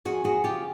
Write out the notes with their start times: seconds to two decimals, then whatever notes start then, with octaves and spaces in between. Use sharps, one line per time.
0.05 F2 F#4 G#4
0.24 F2 F#4 G#4
0.44 C#3 F4 G4